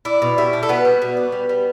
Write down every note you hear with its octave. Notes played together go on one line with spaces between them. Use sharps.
D4 E4
B2
G3 E4
D4
A4
B2 B3 B4
G3
B2
D4
G3
G3